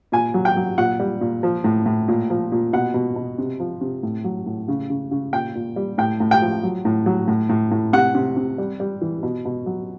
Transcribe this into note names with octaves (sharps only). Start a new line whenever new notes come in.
A#2 G#5
F#3
G5
F#3
A#2 F#5
G3
A#2
F3
A2
A2
A#2
F3
A#2
B2 F#5
B2
B2
C3
F3
C3
A2
F#3
A2
C#3
C#3
C#3
A#2 G5
A#2
G3
A2 G5
A2
G5
F3
F#3
A2
F#3
A2
A2
A2
C3 F#5
C3
C3
G3
G3
E3
B2
B2
F#3